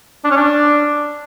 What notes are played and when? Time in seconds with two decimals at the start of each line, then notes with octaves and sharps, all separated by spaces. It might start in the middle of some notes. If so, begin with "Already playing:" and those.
0.24 D4
0.31 C#4
0.37 D4